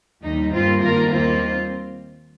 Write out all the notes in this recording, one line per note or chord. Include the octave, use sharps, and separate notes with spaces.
D#2 D#3 G3 D#4
G2 G3 A#3 C4 F4
G2 D#3 A#3 F4 A#4
D#2 D#3 G3 A#3 C4 F4